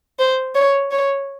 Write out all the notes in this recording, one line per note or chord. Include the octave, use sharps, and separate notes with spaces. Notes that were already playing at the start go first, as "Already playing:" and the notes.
C5
C#5
C#5